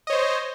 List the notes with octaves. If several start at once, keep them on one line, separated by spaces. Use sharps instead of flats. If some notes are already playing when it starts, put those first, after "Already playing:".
C5 C#5 D#5